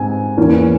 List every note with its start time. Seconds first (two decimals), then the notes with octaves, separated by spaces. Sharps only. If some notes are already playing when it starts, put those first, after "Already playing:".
Already playing: G#2 C4 G#5
0.37 E2 E3 A#3 C#4